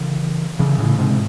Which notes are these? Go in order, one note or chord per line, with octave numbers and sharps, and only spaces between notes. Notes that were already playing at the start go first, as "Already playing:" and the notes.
Already playing: C#3 E3
C#3 E3
A2 C#3
G#2 C3